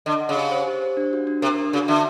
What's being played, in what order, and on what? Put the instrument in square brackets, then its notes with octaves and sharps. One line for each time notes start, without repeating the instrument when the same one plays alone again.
[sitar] D3 [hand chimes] D#5
[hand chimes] F#5
[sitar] C#3
[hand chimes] G4
C5
G4
C5
D4
F#4
D4
[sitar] C3 [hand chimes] A#4
[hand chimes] D4
[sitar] C#3 [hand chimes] F#4
[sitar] D3 [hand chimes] E5